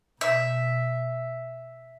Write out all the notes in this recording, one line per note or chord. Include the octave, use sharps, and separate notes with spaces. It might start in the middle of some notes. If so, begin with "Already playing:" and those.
B2 E5